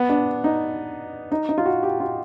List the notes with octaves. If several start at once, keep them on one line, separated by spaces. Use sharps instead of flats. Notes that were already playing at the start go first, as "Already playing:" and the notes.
Already playing: B3
D4
D#4
D#4
D#4
F4
F#4
G4
F4